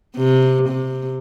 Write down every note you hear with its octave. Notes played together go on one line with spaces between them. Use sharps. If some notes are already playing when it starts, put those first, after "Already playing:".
C3
C3